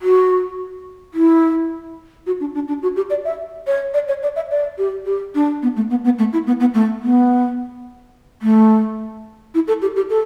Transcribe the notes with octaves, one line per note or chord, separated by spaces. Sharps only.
F#4
E4
F#4
D4
D4
D4
F#4
G4
D5
E5
C#5
D5
C#5
D5
E5
D5
G4
G4
D4
B3
A3
B3
B3
A3
E4
B3
B3
A3
B3
A3
E4
A4
G4
G4
A4